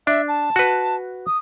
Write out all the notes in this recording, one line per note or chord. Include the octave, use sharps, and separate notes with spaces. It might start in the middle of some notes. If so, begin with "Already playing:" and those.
D4 E5
A5
F#4 B4
D#6